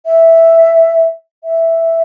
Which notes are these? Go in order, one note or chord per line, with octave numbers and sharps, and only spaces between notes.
E5
E5